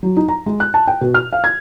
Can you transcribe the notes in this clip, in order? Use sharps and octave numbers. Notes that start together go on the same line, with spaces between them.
F#3
D#4
A#5
G#3
F#6
A5
G5
B2
F6
F5
G#6